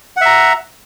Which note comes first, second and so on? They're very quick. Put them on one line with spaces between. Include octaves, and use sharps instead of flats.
F#5 E5 A#5